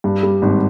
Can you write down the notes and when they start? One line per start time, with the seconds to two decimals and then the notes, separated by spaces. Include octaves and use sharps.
0.04 G2
0.23 G3
0.42 G#1